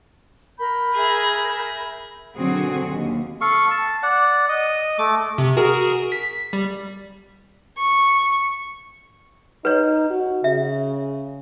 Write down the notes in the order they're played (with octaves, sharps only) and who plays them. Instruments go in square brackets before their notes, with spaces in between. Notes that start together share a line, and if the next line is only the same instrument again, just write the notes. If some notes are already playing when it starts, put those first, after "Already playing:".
[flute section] A#4 B5 G6
[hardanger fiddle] G#4 E5
[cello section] B2 D3 F#3 C4 F#4 G#4
D#2
[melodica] A4 F5 C#6
A5
D5 F#5
D#5
A3 D6
[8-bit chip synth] C3
F#4 G#4 A#4
B6
G3
[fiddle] C#6
[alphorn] D#4 [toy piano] B4 C#5
[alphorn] F#4
[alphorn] C#3 [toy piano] E5